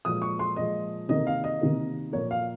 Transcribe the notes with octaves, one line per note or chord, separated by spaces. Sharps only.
A#2 F3 G#3 D#6
C#6
C6
A#2 F3 G#3 D#5
C3 D#3 A#3 D#5
F5
D#5
C3 D#3 A#3
A#2 F3 A#3 C#5
F5